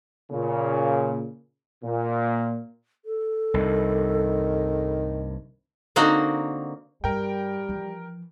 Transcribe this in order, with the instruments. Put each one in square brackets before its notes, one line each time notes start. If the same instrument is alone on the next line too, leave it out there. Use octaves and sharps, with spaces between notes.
[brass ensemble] A#2 C#3
A#2
[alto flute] A4
[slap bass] C2 G2 [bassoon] D#3
[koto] D3 A#3 C4 D#4 F#4 F#5
[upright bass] G2 [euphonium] G3 [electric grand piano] A#4 G5
[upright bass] E3 F3